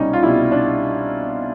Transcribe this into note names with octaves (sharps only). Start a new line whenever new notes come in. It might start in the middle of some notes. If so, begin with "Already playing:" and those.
Already playing: C2 B2 G3 C#4 D#4
F4
C2 B2 G3 E4
D4